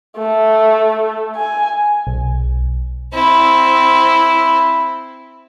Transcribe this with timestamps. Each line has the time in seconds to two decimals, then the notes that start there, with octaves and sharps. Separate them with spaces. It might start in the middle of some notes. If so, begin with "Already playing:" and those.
0.17 A3
1.36 G#5
2.07 B1
3.13 C4 E4